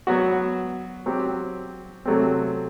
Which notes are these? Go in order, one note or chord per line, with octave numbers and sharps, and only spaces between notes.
F#3 B3 F#4
F#3 C4 G4
C3 F#3 A3 C4